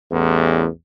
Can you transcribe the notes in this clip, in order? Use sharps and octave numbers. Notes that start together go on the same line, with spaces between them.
A1 E2